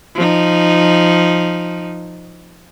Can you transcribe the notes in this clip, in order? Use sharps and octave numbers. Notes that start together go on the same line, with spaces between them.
F3 D#4